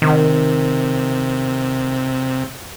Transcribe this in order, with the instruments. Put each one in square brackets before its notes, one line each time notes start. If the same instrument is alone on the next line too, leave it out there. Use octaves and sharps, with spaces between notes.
[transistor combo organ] C3 [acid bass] D#3